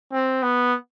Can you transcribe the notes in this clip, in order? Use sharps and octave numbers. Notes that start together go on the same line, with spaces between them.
C4
B3